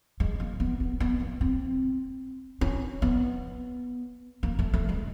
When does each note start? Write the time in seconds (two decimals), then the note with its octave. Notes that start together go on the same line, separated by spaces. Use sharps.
0.20 G#3
0.40 A#3
0.60 B3
0.80 B3
1.00 B3
1.20 A#3
1.41 C4
2.61 C#4
3.02 B3
4.43 A#3
4.59 A3
4.74 A3
4.89 G#3